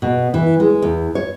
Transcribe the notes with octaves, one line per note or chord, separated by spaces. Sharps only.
B2
E3
G#3
E2
C#5